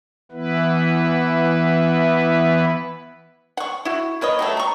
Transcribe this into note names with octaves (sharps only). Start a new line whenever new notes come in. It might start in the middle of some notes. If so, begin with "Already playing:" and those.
E3 B3 E4 B4
F#5 C#6
E4 F#4
A#3 B4 C#5 D#5
F#3 G3 A3
A#5 C#6